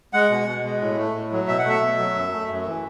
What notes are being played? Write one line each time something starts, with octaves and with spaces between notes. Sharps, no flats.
G#3 F#5
B2
B2
G#3
A2
A3
A2
F#3
B2 E5
F#5
A3 E5
B2
F#3
F#2
A3
F#2
E3